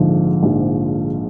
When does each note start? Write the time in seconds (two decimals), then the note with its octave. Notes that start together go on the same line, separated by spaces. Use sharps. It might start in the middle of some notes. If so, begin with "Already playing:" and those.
Already playing: A#1 G#2 D3 F3
0.43 A#1 G#2 F3